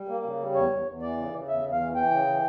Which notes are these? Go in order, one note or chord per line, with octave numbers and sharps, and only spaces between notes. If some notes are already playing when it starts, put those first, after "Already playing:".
Already playing: G3
A#3
C#3
G3
E2 C#5
E2
E2
E3 D5
C#3
C#3
E2 E5
E2
F5
E3
E3 G5
C#3
E3